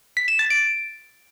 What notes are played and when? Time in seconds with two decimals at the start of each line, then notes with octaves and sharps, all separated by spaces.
0.17 B6
0.28 E7
0.39 A6
0.50 D7